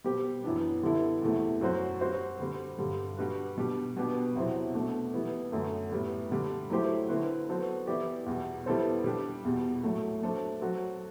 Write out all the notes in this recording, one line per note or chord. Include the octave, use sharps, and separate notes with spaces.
B2 G3 C4 G4
F#2 E3 B3 D4
D3 G3 B3 E4 A4
E2 C3 E3 A3
F#2 F#3 C4 F#4 C5
G3 C4 F#4 C5
D3 G3 C4
G2 D3 G3
G3 D4 F#4 B4
B2 G3 D4 G4
B2 G3 B3 D4 G4
E2 C3 F#3 C4 E4
B2 A3 D4
E3 G3 B3 E4
F#2 D3 A3
A2 G3 B3
D3 G3 D4
F#3 A3 E4 G4 C5
D3 A3 C4 E4 B4
F#3 B3 F#4 A4 C5
E3 B3 E4 G4 D5
E2 B2 G3
G3 B3 E4 A4 C5
G3 D4 G4
E2 B2 G3
A2 F#3 A3
F#3 A3 D4 A4 C5
F#3 C4 F#4 A4